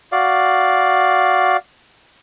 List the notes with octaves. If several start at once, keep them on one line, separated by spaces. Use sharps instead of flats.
F#4 D5 F5